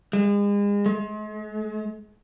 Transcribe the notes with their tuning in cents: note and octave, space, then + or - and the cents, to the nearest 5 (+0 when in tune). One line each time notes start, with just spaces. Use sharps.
G#3 -35
G#3 +40